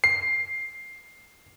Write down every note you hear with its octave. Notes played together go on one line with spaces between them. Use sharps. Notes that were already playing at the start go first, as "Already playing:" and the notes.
C7